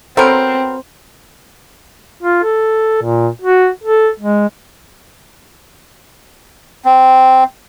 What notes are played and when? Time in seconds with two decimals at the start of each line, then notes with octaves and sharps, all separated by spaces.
0.17 F#3 B3 C4 A4 A#4 C5 G5
2.23 F4
2.43 A4
3.02 A#2
3.42 F#4
3.84 A4
4.20 G#3
6.85 C4